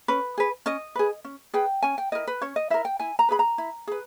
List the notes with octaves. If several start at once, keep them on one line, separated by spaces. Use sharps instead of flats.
C#4 B4
G#4 B4
C#4 D#5
G#4 B4
C#4
G#4 B4 G5
C#4 G#5
G5
E4 A#4 D#5
B4
C#4 C#5
D#5
E4 A#4 E5
G5
E4 G#5
A#5
G#4 B4 B5
A#5
E4
G#4 B4